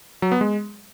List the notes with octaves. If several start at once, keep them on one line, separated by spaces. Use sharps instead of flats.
F#3
B3
G#3